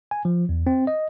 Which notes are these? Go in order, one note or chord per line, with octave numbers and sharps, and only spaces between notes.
G#5
F3
E2
C4
D#5